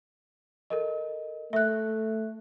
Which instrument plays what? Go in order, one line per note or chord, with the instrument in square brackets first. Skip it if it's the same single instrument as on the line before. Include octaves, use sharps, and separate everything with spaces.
[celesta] A4 A#4 D#5
[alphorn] A3 [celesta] E5 F#6